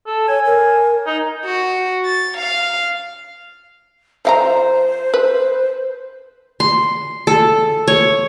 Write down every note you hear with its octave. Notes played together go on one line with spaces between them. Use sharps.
A4
C#5 G#5
A#4
D#4
F#4
A6
F5
F3 C5 F5 A#5
B4
C6
A4
C#5